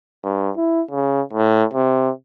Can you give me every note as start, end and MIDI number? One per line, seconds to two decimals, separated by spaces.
0.24 0.50 43
0.56 0.82 64
0.91 1.21 49
1.33 1.64 45
1.73 2.10 48